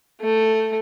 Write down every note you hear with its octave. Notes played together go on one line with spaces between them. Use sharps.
A3